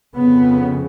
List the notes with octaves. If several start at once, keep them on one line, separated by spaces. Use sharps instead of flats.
F2 C#3 B3